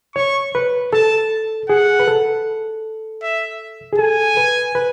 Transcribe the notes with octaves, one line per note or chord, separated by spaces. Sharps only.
C#5 C#6
B4
A4 A5
G#4 F#5
B4
A4
E5
G#4
A4 G#5
B4
B4